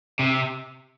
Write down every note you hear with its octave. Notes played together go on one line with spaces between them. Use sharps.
C3